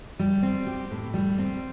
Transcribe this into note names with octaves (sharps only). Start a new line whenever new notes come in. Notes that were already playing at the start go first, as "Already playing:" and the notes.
G3
C4
G4
A2
G3
C4